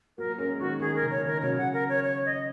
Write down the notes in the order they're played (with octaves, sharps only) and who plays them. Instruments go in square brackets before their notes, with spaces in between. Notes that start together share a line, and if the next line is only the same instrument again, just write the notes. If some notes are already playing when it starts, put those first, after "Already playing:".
[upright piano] F#3 A#3 [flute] A#4
[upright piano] G#3 C#4 [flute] A#4
[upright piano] D#3 G#3 [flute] F#4
[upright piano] D#3 [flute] G#4
[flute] A#4
[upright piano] C#3
[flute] C#5
[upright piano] D#3 [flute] A#4
[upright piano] C#3 F#3 [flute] C#5
[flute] F#5
A#4
C#5
C#5
D#5